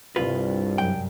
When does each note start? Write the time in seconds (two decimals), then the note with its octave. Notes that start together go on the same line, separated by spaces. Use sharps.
0.16 C2 G2 C3 F4 B4
0.78 F#2 F#3 G5